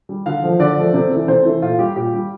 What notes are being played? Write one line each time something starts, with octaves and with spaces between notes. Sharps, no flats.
G3
D3 F5
F3 A3
D3 D5
F3 A3
C3
E3 A3
C3 C5
E3 A3
A#2 F4
G3 G4
A#2 G4
G3